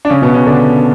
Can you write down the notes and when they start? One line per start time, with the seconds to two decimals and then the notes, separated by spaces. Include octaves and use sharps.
0.05 D4
0.10 C#3 C#4
0.22 B2 B3
0.34 C#3 C#4
0.46 D3 D4